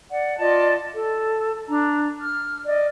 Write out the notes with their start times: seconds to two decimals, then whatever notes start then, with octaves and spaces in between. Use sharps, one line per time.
0.10 D5 F#5
0.38 F4 D5 D#5 A5
0.94 A4
1.68 D4 A#5
2.20 F6
2.66 D5 D#5